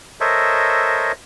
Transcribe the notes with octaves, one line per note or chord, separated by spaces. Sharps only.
A4 A#4 C5 C#5 D#5 E5